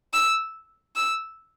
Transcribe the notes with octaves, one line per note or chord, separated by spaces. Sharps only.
E6
E6